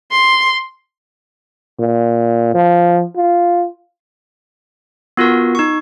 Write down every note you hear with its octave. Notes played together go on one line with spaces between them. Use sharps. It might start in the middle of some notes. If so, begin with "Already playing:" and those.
C6
A#2
F3
F4
B3 F4 F#4 A#4
D#4 C#6